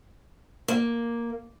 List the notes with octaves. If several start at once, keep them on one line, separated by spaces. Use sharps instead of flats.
A#3